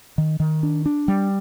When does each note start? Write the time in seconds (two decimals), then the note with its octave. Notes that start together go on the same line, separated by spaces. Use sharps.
0.18 D#3
0.40 D#3
0.63 D4
0.86 D4
1.08 G3